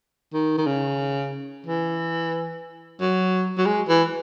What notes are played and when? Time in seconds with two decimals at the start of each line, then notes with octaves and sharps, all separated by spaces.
0.33 D#3
0.58 D#3
0.66 C#3
1.67 E3
3.01 F#3
3.58 F#3
3.66 G#3
3.88 E3